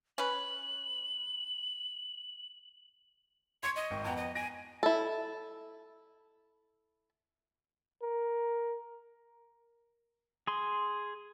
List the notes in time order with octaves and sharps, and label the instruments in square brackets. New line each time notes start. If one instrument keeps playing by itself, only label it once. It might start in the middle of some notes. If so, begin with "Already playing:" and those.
[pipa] C#4 B4 [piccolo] F#7
[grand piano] C6 C#6 C#7 [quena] G#6
[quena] D#5
[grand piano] G#1 G5 C#6
[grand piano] F2 B3 F#5 [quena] A#5
[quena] D#5
[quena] G#5 [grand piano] A#6 D7
[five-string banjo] E4 A4
[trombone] A#4
[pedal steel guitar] G#4 C6